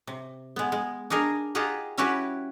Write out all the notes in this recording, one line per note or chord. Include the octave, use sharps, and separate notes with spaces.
C3
G#3 B3
G#3
D4 D#4 G#4 A#4
D#4 F4 G4 G#4 F#5
G3 C#4 E4 F#4 G4 B4